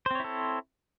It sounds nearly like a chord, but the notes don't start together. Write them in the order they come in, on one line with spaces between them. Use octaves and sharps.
C5 C4 C#5 E4 A4